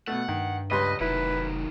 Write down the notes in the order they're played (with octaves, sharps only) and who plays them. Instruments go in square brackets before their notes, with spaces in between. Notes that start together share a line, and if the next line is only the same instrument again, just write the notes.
[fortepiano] B2 A3 [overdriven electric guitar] F#5
[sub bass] G2 [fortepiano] D#3
[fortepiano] C#2 G3 C6 [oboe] B4 [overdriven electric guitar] D#5
[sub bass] F1 [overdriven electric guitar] D#3 F#3 [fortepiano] E4 [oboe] B4